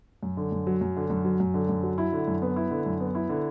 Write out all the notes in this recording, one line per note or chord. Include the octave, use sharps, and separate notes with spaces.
F#2
D3
F#2
F#3
F#2
D3
F#2
F#3
F#2
D3
F#2
F#3
E4
D3
F#2
B3
E4
D3
F#2
B3
E4
D3